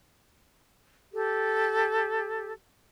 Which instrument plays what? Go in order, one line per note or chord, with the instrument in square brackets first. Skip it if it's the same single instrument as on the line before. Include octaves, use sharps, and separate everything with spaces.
[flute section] G4 A4